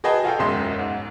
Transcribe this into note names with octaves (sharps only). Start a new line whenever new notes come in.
F#4 G#4 B4 D#5 G5 A5
F4 F#4 A4 F5 G5
E1 B1 F#2 G#3 E5 C6
G#2